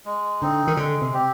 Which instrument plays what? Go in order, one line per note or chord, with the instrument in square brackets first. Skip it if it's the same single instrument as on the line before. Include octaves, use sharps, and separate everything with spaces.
[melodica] G#3
[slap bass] D3 [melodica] C4 D#4
[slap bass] D#3
[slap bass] D3 [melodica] G#3
[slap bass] C3
[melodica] C4 G4